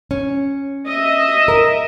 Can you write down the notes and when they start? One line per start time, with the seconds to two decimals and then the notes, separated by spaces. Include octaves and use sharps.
0.11 C#4
0.87 D#5 E5
1.48 A#4